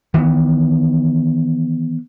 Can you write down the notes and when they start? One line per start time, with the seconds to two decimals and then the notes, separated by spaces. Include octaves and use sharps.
0.14 D#3 E3 A#3 B3